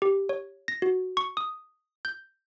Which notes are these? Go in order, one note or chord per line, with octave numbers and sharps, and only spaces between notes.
G4
C#5
A#6
F#4
C#6
D#6
G6